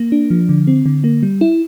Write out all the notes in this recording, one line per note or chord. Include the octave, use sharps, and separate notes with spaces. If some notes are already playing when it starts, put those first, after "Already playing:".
Already playing: A#3
D4
F3
D3
C4
D3
A#3
G3
E4